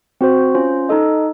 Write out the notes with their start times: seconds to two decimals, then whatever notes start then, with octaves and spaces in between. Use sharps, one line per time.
0.21 C4 F#4 C5
0.55 C#4 F4 C5
0.89 D#4 A4 D#5